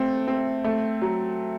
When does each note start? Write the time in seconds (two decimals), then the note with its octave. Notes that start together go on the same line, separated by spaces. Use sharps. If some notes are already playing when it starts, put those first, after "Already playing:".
Already playing: A3 C4
0.28 C4
0.64 A3
1.02 F#3